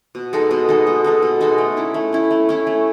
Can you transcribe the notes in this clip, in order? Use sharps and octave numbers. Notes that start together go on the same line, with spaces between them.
B2
G#3 D#4 A4
B2
G#3 D#4 A4
B2
G#3 D#4 A4
B2
G#3 D#4 A4
A3
C#4 E4
A3
C#4 E4
A3
C#4 E4
A3